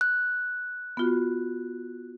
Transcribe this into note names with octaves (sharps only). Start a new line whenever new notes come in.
F#6
B3 F4 F#4